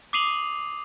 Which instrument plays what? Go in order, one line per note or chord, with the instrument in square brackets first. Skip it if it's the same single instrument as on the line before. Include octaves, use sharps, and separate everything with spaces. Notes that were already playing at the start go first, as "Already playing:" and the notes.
[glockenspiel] D6 D#6 C7 D#7 F7 F#7